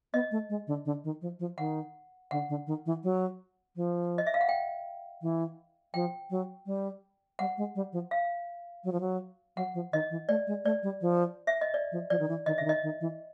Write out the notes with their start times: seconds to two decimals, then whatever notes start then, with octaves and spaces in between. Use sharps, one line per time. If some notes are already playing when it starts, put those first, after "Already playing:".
0.13 B3 D#5
0.31 A3
0.50 G#3
0.67 D3
0.85 D3
1.04 D#3
1.21 F3
1.40 F3
1.58 D#3 F#5
2.31 D3 F#5
2.49 D3
2.67 D#3
2.86 E3
3.04 F#3
3.76 F3
4.18 D#5
4.26 E5
4.34 F5
4.41 F#5
4.49 G5
5.22 E3
5.94 F3 G5
6.30 F#3
6.66 G3
7.39 G3 F#5
7.58 G#3
7.75 G3
7.93 F3
8.11 F5
8.84 F#3
8.92 F3
9.00 F#3
9.56 F#3 F#5
9.74 F3
9.92 D#3 D#5
10.10 E3
10.28 A3 D5
10.47 G#3
10.65 A3 D5
10.83 G3
11.01 F3
11.47 E5
11.61 D#5
11.74 D5
11.92 F3
12.10 F3 D5
12.19 D#3
12.29 E3
12.46 D#3 D#5
12.58 D3 E5
12.65 D#3
12.69 D#5
12.83 D#3
13.01 E3